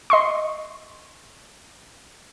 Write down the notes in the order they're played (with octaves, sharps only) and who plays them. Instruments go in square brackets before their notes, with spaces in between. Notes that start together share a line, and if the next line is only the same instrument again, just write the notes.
[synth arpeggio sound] D#5 C6 C#6